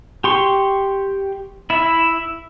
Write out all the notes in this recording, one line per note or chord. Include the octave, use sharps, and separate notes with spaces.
G4 C6 C#6
E4 E5